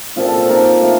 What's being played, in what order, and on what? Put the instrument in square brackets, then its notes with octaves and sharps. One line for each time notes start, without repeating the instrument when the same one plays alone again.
[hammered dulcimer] A#2 F3 C4 F4
A4
A4
F3 A#3 D#4 A#4
F3 A3